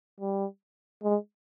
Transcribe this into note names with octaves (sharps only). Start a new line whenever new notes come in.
G3
G#3